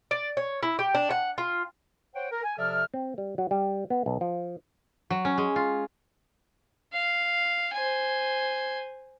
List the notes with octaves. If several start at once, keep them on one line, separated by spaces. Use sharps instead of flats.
D5
C#5
E4
G4
D4
F#5
F4
C5 C#5 F#5 G5
A#4
G#5
C3 F3 A4 D5 E5 F6
C4
G3
F#3
G3
B3
B1
F3
F#3
C#4
G#3
F4
F5
C5 G#5